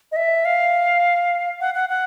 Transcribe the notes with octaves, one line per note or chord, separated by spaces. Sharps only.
D#5
E5
F5
F#5
F#5
F#5